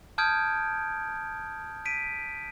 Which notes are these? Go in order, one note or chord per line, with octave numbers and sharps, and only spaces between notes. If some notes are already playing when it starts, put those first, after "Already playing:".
A5 D#6 F6 G6 G#6 D7
B6 D7 D#7